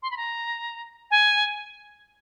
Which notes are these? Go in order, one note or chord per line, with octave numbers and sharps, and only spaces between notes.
C6
B5
A#5
G#5